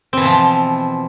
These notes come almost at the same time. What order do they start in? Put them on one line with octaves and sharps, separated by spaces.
C4 E3 B2 F3